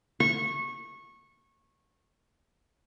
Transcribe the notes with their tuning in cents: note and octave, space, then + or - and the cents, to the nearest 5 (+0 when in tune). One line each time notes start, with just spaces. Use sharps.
C#6 -20